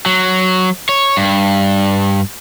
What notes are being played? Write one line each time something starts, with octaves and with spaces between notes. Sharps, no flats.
F#3
C#5
G2